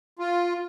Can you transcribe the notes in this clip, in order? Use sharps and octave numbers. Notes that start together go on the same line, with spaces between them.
F4